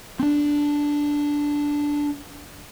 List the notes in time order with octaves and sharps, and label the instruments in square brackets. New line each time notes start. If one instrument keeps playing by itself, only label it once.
[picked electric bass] C4 D4